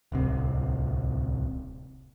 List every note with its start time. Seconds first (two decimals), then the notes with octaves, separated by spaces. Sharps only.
0.12 D1 C2 C3